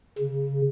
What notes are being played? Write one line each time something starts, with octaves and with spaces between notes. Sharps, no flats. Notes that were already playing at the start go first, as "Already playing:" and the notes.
C#3